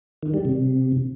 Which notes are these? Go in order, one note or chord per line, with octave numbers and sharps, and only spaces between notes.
D#3
G3
C3